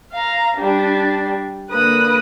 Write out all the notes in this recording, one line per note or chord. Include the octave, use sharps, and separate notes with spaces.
F5 A#5
G3 D4
D3 A#3 B4 D#6 F#6